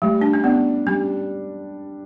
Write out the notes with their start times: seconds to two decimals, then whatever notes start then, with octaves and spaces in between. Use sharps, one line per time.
0.02 G3 A3
0.21 D4
0.33 C#4
0.44 B3 D4
0.86 G3 C#4